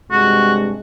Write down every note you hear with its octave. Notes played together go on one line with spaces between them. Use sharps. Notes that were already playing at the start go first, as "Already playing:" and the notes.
G2 C3 G#3 F#4